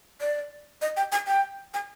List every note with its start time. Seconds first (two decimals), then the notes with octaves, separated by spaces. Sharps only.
0.21 D5
0.82 D#5
0.97 G5
1.12 G#5
1.27 G5
1.74 G#5